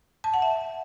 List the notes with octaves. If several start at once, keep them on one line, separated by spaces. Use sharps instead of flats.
A5
F#5
E5